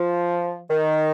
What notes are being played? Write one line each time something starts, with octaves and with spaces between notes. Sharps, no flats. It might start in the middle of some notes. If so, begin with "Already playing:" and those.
Already playing: F3
D#3